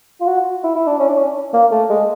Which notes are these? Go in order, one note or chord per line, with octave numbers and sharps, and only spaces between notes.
F4
F#4
E4
E4
D4
C#4
D4
C#4
A#3
A3
G#3